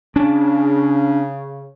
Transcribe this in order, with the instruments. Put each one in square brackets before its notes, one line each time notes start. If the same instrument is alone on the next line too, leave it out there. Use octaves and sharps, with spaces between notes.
[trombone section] C#3 [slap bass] C#4 D4